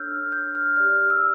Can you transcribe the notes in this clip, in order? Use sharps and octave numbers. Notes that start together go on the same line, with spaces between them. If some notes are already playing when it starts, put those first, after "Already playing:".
Already playing: D4 A4 C#5 E6 F6 G6
G6
F6
G4 D5 F6
E6